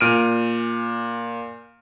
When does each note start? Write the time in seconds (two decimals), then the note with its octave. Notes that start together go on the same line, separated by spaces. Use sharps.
0.01 A#2 F6 D7 D#7